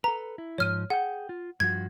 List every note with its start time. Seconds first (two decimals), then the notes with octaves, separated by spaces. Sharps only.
0.04 A4 B4 A#5
0.38 E4
0.58 G#2 F3 C#5 F6 D#7
0.90 G#4 F#5 G5
1.29 F4
1.60 G2 F3 F#4 G#6